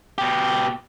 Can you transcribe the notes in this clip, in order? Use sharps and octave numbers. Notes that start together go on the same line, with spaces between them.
B2 G4